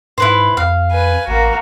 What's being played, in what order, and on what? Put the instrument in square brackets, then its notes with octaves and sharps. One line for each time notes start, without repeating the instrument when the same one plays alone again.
[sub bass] G#2 [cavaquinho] E4 B4 C5
[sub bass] F2 [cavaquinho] F5
[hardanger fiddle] B4 G#5
[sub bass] A1 [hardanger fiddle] A#3 F#4